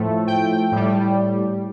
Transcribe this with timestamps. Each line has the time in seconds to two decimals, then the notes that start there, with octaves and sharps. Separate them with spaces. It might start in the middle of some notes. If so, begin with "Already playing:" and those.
Already playing: A2 F3 A3
0.27 G5
0.71 A2 G3